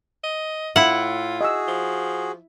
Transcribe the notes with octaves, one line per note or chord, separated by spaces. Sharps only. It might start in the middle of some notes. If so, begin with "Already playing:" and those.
D#5
A2 E4 F4 E5 F#5
F#4 G#4 D#5 E6
F3